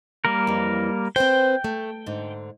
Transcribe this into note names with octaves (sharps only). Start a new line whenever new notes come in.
G3 A#3 A#4
F2 E3
C4 B4 C5 G5
A3
G#2 D3